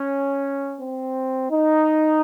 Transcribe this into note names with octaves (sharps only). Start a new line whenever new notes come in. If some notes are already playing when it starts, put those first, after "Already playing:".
Already playing: C#4
C4
D#4